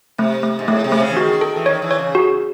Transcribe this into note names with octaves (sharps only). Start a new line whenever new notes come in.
C3 A3
A3
G#2
A2 A3
C3
A3
C#3
E3
D#3 F#4
A4
E3
D#3 C#5
E3
C#5
C#3
F#4